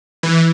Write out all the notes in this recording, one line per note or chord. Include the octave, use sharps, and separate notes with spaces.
E3